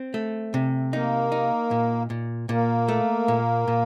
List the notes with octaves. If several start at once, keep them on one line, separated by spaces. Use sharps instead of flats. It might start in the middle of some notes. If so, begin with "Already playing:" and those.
Already playing: C4
A3
C3
A#3 D#4
D#4
A#2
A#2
A#2 A#3
A3
A#2
A#2